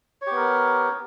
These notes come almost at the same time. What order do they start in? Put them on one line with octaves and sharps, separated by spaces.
C#5 G4 B3 A#4